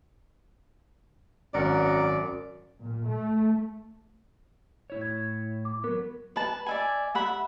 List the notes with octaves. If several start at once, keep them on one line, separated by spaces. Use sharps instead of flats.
G#1 F#2 A#4 D5 F#5
A#2
A3
A2 E4 C#5
G#6
D6
F#3 B3 A#4
B4 A5
D5 E5 G#5
E5 F#5 B5